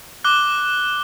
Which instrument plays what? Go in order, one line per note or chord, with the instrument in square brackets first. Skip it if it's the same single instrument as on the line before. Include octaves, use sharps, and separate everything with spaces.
[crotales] D6 F#6 G7